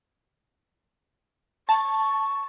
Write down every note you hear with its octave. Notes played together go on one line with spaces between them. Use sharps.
A5 C#6